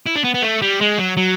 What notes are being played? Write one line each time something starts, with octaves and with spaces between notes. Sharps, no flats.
E4
D4
B3
B3
A3
G3
G#3
F#3
F#3